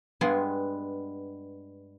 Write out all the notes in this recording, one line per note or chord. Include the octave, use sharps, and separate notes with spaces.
G2 G#3 B3 C6